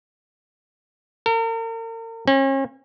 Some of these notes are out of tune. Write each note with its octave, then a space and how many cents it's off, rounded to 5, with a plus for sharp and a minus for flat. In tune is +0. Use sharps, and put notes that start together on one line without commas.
A#4 -40
C#4 -40